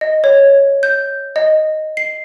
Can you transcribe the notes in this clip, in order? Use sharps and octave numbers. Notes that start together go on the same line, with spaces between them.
D#5
C#5
G6
D#5
C7